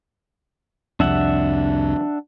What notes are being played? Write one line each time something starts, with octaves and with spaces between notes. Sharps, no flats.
C2 F2 D4 E5 F#5